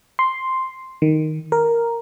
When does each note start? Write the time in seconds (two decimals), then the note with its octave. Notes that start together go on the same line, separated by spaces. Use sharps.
0.19 C6
1.02 D#3
1.52 A#4